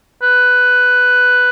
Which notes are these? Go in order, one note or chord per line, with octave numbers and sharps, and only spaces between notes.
B4